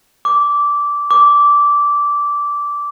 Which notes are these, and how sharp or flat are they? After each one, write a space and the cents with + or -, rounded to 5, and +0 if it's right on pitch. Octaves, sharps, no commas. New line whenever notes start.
D6 -15
D6 -15